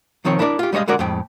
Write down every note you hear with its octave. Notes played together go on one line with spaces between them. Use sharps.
C2 D#3 F3 C4 C#5
D4 E4 A#4 C5 D5
F4 G4
G3 G#3 C#5 D#5 F5
D3 G#3 F#4 A#4 D5
F2 A2 G#3 G5